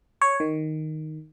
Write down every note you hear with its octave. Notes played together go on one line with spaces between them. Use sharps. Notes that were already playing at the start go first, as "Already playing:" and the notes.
C#5
D#3